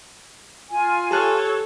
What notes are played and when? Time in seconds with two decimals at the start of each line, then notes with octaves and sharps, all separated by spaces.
0.70 F4 G#5
1.11 G4 A4 C#5 A5 F#6